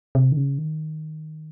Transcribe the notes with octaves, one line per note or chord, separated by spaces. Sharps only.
C3
D#3
C#3
D#3